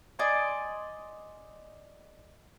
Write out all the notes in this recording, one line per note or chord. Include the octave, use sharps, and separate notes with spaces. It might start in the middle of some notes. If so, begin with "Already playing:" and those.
D5 D#5 G#5 C6